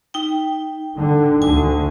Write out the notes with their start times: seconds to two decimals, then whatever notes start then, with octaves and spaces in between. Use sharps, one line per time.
0.14 D#4 G5
0.98 D3
1.42 D2 D3 G#5